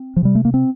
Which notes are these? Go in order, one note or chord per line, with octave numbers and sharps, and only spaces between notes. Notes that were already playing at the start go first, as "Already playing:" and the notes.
Already playing: C4
F3
C3 G3
A3
A#3
C4